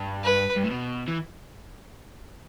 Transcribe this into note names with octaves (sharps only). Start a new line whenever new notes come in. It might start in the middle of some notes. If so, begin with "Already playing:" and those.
Already playing: G2
B4
G2
A2
B2
E3